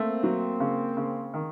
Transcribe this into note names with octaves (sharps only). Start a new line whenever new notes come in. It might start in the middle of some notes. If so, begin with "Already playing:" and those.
Already playing: A3 A#3 C4
F#3
C#3
C#3
D#3